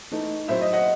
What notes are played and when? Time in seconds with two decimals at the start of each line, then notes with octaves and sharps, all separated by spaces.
0.11 E3 A3 D#4
0.48 A2 F#3 C4 C5 E5
0.61 D#5
0.73 D#5 F#5